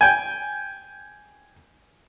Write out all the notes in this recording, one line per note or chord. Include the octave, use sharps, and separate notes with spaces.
G5 G#5